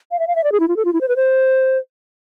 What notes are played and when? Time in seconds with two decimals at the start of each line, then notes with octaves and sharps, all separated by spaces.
0.11 F5
0.19 E5
0.27 F5
0.36 E5
0.44 D5
0.52 G#4
0.60 E4
0.68 F4
0.77 A4
0.85 F4
0.93 E4
1.01 C5
1.08 B4
1.16 C5